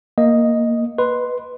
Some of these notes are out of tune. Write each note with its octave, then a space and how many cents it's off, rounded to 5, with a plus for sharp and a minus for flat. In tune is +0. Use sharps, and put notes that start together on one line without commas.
A#3 +0 D#5 +0
B4 +0 D#5 -10 C6 +0